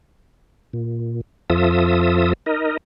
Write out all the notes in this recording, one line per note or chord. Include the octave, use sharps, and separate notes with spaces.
A#2
F2 F3 F4 A4 E5 D#6
D#4 A#4 D#5